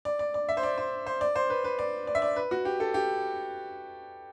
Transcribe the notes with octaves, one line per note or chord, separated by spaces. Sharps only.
D5
D5
D5
E5
C5
D5
C5
C5
D5
C5
B4
B4
D5
D5
E5
D5
B4
F#4
G4
A4
G4